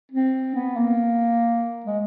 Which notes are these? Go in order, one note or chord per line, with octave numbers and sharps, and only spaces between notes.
C4
B3
A#3
G#3